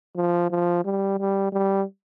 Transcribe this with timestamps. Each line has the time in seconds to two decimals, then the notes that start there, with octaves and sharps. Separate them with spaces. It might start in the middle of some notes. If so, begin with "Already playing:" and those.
0.16 F3
0.50 F3
0.85 G3
1.19 G3
1.52 G3